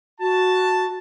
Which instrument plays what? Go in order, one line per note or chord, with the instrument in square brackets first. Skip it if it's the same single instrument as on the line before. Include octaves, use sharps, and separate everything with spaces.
[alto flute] F#4 [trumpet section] A5